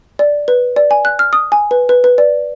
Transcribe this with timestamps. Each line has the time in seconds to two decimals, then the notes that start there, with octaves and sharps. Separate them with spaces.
0.19 D5
0.48 B4
0.76 D5
0.91 G#5
1.05 F#6
1.19 F6
1.33 D#6
1.52 G#5
1.71 B4
1.89 B4
2.04 B4
2.18 D5